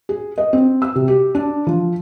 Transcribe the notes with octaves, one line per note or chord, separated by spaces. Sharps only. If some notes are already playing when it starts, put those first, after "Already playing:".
G#4
D#5
C4
E6
C3
G4
D4
F3